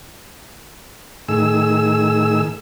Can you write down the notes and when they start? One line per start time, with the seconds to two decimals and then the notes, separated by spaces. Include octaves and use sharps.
1.29 A2 D#3 G#4 E6